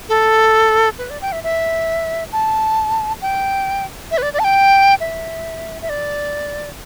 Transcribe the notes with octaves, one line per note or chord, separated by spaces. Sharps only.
A4
B4
D5
G5
E5
E5
A5
G5
E5
B4
D5
D5
A5
G5
E5
E5
D5